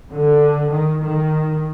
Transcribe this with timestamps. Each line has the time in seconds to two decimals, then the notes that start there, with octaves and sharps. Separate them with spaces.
0.13 D3
0.71 D#3
1.00 D#3